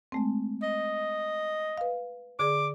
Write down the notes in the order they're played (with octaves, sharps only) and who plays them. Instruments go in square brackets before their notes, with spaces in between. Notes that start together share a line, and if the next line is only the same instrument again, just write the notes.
[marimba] G#3 A3 C4
[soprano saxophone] D#5
[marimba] B4 F5
[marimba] D3 G#4 D5 [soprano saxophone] D6